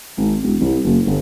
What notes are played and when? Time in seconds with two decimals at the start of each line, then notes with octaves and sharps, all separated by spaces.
0.17 G#1
0.43 E1
0.60 C2
0.84 F#1
1.06 G1